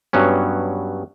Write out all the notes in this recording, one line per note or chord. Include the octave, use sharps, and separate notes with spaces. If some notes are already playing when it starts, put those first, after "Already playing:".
G2 F#3 B3 C#4